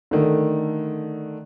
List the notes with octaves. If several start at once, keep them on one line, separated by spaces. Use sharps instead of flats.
D3 D#3 A3